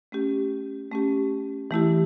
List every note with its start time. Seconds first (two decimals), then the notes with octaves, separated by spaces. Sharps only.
0.12 A3 C#4 G4
0.91 A3 C#4 G4
1.71 E3 A3 E4 G4